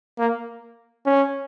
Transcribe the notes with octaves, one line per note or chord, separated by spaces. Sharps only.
A#3
C#4